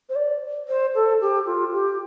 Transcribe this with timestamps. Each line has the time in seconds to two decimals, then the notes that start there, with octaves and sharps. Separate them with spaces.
0.09 C5
0.16 D5
0.68 C5
0.95 A4
1.21 G4
1.46 F4
1.73 G4